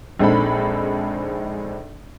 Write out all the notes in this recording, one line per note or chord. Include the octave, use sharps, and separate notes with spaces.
A#1 G#3 C4 D#4 A4 B5